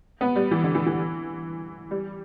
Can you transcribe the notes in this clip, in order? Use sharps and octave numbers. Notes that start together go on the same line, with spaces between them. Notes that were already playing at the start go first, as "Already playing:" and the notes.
B3
G3
E3
D3
E3
E3
G3